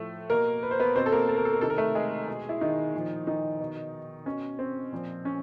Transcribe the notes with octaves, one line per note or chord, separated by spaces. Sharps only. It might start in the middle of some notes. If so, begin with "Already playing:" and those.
Already playing: A2 F3 A3 A4
B2 A#3 A#4
B4
C5
B3 B4
B2 C4 C5
A4
A#3 A#4
A4
A#4
A4
A#4
C3 D#3 A4
A#4
A3 A4
G#3 G#4
B2
E4
D#3 D#4
A#2 F3
D#3 D#4
B2
B2 C#4
C4
A#2 F3
C#4